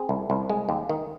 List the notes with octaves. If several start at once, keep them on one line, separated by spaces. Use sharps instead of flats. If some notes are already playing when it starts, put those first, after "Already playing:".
Already playing: C4 G#4
C2
C2
G#3
D#2
D#3